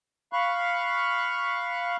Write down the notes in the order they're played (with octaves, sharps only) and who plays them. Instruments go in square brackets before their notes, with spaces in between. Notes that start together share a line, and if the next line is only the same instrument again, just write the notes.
[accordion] F5 B5 C#6 F#6